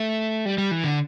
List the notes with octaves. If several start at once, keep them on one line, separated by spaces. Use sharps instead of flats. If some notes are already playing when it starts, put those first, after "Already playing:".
Already playing: A3
G3
G3
E3
D3